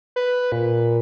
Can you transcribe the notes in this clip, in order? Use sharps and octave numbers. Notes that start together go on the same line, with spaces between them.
B4
A#2